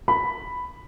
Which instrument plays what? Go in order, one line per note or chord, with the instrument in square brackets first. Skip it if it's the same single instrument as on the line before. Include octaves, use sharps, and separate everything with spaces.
[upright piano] B5